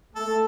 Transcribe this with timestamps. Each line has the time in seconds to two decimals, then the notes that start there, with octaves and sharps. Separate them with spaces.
0.15 A3 A4